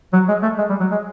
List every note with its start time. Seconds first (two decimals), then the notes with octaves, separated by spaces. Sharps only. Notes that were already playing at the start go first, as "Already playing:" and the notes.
0.13 F#3
0.29 G#3
0.43 A3
0.58 G#3
0.70 G3
0.80 F#3
0.91 G#3